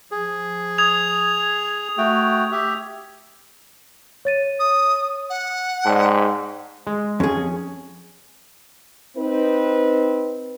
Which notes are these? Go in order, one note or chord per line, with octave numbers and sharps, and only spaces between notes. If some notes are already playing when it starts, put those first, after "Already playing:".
F3 G#4
D#6 G#6 F7
A3 F#4 G5
G4 E5
C#5 A6 D#7
D#6
F#5
G#2 D5 G5 A5
G#3
F2 C#4 G#4
C4 D#4 B4